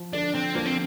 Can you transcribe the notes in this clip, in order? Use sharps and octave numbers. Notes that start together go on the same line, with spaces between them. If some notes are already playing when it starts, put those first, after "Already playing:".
Already playing: F3
D3 D4
C4
F3 A#3
C4